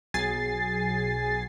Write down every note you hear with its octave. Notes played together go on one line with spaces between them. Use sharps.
B1 F#3 G#4 G#5 A6 C7